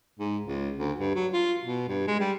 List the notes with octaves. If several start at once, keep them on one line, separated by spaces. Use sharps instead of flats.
G#2
C#2
D2
G2
F#3
F4
B2
G2
G#3
G3